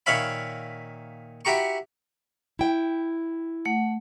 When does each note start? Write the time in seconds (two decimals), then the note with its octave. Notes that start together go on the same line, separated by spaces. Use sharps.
0.06 A#2 D#3 C#5 E5 F5 B5
1.45 E4 F#4 G4 A#5 C#6
2.59 E4 G5
3.65 A3 F#5